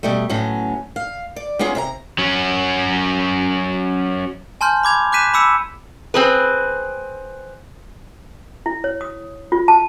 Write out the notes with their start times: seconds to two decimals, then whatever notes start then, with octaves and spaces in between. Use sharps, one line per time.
0.03 B2 G3 A3
0.29 A2 F#3 B3 C#4
0.96 F5
1.36 D5
1.59 A#3 B3 C#4 F4 G#4
1.75 C3 E5 A#5
2.18 F#3 C#4
4.61 G#5 A5 C6 F6 G6
4.83 B5 D6 G#6 F7
5.12 D6 F#6 G6 B6 D#7 E7
5.34 B5 D6 E6 C#7 E7
6.14 C4 G#4 B4
8.66 E4
8.84 C#5
9.01 D#6
9.52 F4
9.68 A5